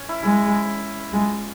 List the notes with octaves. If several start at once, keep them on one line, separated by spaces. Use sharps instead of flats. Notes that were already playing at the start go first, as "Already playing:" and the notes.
Already playing: C#4
E4
G#3 E4
G#3 F4